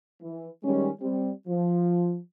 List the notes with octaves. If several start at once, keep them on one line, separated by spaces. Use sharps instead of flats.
E3
D#3 G3 G#3 C#4
G3 C4
F3